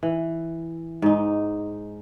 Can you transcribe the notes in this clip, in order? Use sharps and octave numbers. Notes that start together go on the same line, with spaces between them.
E3
G#2 D#4